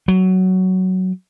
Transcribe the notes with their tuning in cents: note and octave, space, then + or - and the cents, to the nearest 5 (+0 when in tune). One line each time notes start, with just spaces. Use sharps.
F#3 +10